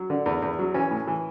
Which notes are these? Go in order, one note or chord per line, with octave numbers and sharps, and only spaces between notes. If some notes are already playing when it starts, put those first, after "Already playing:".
Already playing: F#3
D3
E2
E2
F#3
E3 C#4
A2
E3